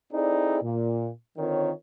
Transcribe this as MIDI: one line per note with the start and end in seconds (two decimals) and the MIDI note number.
0.13 0.58 60
0.13 0.58 63
0.13 0.58 64
0.13 0.58 68
0.13 0.58 69
0.13 0.58 74
0.62 1.08 46
1.38 1.71 50
1.38 1.71 51
1.38 1.71 60
1.38 1.71 65
1.38 1.71 70
1.38 1.71 73